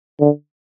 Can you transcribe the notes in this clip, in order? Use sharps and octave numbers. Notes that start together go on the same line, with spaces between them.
D3